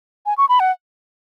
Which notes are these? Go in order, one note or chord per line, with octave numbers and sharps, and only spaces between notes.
G#5
C#6
B5
F#5